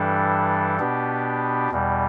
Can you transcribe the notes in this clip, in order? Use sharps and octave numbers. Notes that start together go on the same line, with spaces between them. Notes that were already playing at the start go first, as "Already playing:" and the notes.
Already playing: G2 E3 G3 D4 A4
B2 B3 D4 G4
E2 B2 G3